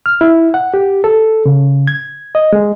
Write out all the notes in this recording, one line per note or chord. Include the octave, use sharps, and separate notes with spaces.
F6
E4
F#5
G4
A4
C#3
G#6
D#5
G#3